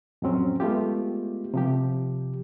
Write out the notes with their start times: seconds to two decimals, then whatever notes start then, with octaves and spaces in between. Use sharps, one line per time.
0.22 F2 A2 F#3 C4 C#4
0.60 G#3 A3 B3 F4 G4
1.54 C3 F3 G4